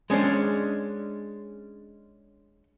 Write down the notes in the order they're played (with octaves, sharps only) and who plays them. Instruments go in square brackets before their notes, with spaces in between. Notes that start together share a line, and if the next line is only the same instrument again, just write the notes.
[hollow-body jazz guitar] G#3 C#4 D4 C5